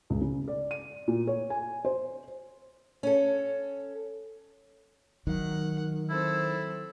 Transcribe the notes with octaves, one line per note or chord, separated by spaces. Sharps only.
C#2
C#3
D5
D#7
A#2
C#5
G#5
C5
C#4 A4
D#3 F#3 F#5
C4 E4 A4